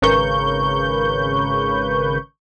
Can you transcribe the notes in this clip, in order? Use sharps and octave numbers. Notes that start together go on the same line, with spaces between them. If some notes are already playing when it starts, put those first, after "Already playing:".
G#1 C#3 A#4 B4 C#6 G6